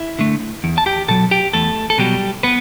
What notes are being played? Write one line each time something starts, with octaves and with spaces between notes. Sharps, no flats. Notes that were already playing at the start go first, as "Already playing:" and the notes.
Already playing: E4 E5
D3 A3
E2
A5
G4 G5
B2 F#3 A4 A5
G4 G5
E2 A3 A4
A4
B2 F#3 G3 G4
B3 B4